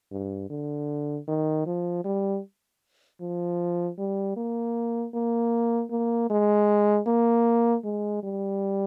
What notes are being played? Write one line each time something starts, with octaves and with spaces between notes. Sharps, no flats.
G2
D3
D#3
F3
G3
F3
G3
A#3
A#3
A#3
G#3
A#3
G#3
G3